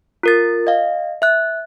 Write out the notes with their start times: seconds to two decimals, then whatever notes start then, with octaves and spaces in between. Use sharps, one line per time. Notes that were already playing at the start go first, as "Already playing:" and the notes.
0.23 F4 A#4 A6
0.67 D#5 F5
1.22 E5 F#6